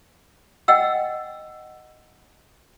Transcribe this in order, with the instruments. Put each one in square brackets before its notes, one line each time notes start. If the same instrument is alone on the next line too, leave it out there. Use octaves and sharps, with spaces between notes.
[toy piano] D#5 F#5 G5 E6